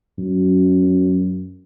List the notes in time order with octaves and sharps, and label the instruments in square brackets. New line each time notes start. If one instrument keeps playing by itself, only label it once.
[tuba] F#2